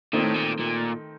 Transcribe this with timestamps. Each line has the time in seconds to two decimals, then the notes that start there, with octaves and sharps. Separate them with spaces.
0.13 A#2 D#3 A3 C4 D#4
0.24 A2
0.35 A#2
0.60 A#2